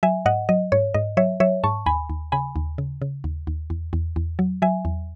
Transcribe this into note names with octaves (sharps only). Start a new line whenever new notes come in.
F#3 E5 G#5
G#2 D#5 F#5
F#3 D#5
G#2 C#5
G#2 D#5
F#3 C#5 E5
F#3 C#5 E5
G#2 A5 C#6
D#2 G#5 B5
D#2
C#3 G#5 B5
D#2
C#3
C#3
D#2
D#2
E2
E2
E2
F#3
F#3 E5 G#5
E2